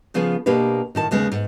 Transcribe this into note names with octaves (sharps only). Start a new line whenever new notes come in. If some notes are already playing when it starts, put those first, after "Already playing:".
C#3 F3 B3 F4 G#4
B2 A#3 D4 G4 B4
A2 D#3 A5
D#2 C#3 G#3 B3
G#2